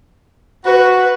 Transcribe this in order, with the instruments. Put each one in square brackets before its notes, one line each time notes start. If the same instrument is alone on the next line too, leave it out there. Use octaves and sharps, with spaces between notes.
[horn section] F#4 [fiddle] B4